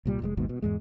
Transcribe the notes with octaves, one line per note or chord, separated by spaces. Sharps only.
C2 A#2 G3
F1 A#2 G#3
G#1 D#2 G#2 B2
B2
E2 G#2 G#3